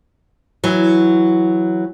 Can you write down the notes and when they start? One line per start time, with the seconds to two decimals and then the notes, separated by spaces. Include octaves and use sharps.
0.64 E3 F#3